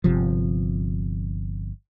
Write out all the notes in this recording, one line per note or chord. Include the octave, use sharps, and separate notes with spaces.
G1 C3 F3